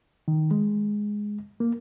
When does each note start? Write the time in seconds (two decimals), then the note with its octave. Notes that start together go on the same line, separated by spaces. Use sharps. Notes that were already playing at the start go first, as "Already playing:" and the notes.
0.28 D#3
0.51 G#3
1.60 A#3